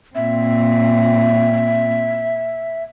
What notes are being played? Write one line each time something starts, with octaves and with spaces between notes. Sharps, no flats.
A#2 C4 E5